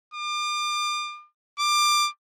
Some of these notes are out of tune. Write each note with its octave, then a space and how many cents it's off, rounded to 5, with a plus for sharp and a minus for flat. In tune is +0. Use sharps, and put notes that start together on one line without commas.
D6 +35
D6 +20